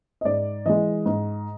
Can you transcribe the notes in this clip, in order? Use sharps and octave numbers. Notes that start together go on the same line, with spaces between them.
D#5
G#2 D5
E3 G#3 D#5
G#2